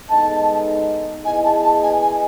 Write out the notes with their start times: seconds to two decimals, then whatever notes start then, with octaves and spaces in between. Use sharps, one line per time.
0.09 G#3 B3 D#4 A4 D#5 A5
1.25 B3 E4 G#4 D#5 G#5
1.44 A5
1.63 A5
1.83 G#5
2.02 G#5